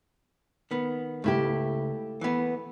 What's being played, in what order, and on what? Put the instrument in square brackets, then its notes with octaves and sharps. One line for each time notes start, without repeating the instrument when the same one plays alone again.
[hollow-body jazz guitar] D#3 B3
[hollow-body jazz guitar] C#2 [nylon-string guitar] A3 E4 G4
[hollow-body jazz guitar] E3 B3